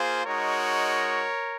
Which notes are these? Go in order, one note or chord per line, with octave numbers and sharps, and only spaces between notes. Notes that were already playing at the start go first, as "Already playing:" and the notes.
Already playing: A#3 F4 G#4 C5
G#3 D#4 F#4 A#4 C#5